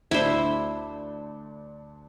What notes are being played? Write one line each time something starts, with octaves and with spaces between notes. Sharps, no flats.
D2 D4 E4 C5